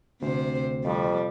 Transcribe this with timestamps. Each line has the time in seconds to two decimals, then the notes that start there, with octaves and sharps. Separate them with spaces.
0.22 D2 C3 C5
0.85 F2 G3